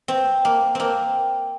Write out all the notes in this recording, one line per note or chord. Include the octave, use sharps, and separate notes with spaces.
C4
A#3
A#3 C4